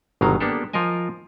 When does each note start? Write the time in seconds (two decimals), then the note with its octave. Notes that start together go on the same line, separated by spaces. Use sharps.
0.21 G1 B2 D#3 F#3 F5 A#5
0.40 A#3 B3 D4 G4 A4
0.73 F3 F4 A#4 D#5 G#5